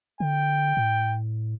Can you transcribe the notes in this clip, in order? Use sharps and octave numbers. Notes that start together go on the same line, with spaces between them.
D3 G5
A2